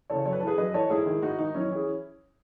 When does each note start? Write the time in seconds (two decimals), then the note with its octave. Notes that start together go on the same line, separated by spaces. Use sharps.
0.10 C#3 E3 A4 C#5
0.26 F#2 C#5
0.33 B4
0.40 E3 A4
0.47 G#4 B4
0.58 F#2 B4 D#5
0.74 E3 A4 C#5
0.90 G#2 E4 G#4
1.06 D#3
1.22 G#2 D#4 F#4
1.39 D#3 D#4
1.54 F#2 C#4 E4
1.71 E3 G#4